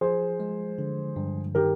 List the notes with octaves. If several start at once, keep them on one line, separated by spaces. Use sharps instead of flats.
F3 G#4 C5
G#3
D3
G2
D#3 G4 A#4